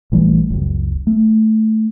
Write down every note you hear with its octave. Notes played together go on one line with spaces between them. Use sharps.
A#1 E3 G3 A3
F#1 C#2
A3